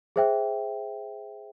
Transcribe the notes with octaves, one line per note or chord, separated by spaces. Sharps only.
G#4 C5 E5 G5